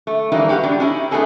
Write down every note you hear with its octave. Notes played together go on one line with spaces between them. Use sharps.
A3
E3 G3 G#3 A#3 D#4
F#4 G4 B4 D#5 F5
G#2 B2 G3 D4
C#4 D#4 E4 G4
A3 B3 D#4 E4 G#4 A4